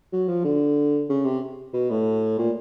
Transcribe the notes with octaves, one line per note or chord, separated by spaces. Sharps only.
F#3
F3
D3
C#3
C3
B2
A2
A#2